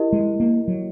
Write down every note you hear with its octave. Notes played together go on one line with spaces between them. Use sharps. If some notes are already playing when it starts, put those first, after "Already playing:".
Already playing: E4 G4 A#4 D#5
G#3
A#3
F#3